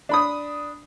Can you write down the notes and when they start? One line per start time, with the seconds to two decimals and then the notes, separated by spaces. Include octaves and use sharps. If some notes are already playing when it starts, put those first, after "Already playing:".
0.09 D4 B5 D#6